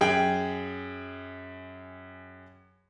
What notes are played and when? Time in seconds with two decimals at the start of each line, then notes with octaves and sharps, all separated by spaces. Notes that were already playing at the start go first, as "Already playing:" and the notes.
0.01 F#2 G#4 G5